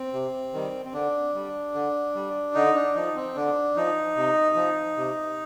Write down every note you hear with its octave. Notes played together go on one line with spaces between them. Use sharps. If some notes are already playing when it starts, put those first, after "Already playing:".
Already playing: C4
C3
D#3 G3
C4
D3 D4
G3
D3
G3
D3 D#4
D4
F3 D#4
C4
D3 D4
F3 D#4
C3
F3
C3